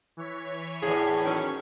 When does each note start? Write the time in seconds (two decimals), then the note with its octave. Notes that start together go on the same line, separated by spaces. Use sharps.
0.17 E3 C#5 B6
0.83 E2 A2 G#4
1.25 D#3 F#3 C#4